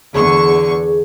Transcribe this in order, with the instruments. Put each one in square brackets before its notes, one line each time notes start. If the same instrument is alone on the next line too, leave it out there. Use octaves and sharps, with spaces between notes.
[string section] E2 D3 C#6 [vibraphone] G#4